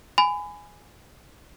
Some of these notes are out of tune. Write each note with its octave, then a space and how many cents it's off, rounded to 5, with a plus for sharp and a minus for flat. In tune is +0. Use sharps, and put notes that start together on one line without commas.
G#5 +0 B5 +30